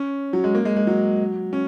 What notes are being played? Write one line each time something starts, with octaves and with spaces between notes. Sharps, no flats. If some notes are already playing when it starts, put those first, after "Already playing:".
Already playing: C#4
F#3
G#3
A#3
G#3
G#3
F#3
C#4